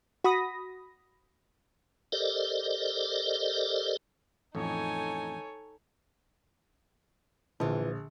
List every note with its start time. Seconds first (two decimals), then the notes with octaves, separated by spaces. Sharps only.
0.24 F#4 B5 D#6 A#6
2.12 G4 A4 A#4 C5 D5 D#5
4.55 A1 F2 D#4 A4 C#5 G#5
7.60 A#1 D3 E3 F4